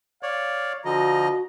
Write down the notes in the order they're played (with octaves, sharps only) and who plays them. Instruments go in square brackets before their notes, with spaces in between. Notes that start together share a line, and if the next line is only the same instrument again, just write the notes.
[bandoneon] C#5 D5 [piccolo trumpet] F5
[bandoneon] D3 F3 D#5 [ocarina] F#4 [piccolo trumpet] A#5